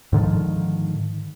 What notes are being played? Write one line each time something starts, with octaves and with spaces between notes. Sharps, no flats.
G#2 D3 D#3 F3